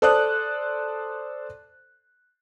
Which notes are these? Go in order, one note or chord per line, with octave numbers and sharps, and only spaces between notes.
A4 C5 D5 D#6 F#6